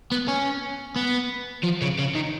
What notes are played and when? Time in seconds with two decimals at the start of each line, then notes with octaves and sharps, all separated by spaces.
0.12 B3
0.28 C#4
0.96 B3
1.64 F3
1.82 C#3
1.99 C#3
2.15 D#3